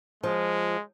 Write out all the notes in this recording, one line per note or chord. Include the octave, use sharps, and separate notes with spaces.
F3 G#3